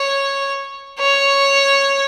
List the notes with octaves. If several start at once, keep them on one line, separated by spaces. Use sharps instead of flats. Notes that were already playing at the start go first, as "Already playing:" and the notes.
Already playing: C#5
C#5